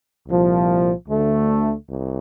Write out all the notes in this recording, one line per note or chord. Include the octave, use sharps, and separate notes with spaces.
C2 A#2 F3
D2 D3 A3
C2